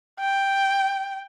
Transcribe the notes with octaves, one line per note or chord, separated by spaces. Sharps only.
G5